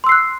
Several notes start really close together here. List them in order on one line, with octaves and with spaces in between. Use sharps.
C6 E6 C7 F#6